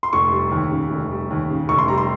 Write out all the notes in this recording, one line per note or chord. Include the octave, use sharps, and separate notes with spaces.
C6
F1 C#6
G3
D#2
C#3
F1
G3
D#2
C#3
F1 C#6
C6
G3 A#5
C6